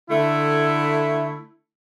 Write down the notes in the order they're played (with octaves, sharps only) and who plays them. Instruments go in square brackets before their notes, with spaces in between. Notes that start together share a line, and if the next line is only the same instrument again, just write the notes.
[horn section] D3 A3 E4